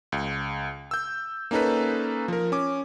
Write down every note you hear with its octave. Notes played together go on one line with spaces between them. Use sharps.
C#2
E6 G6
A#3 C#4 D#4 A4 B4
F3 A#4
C#4 D6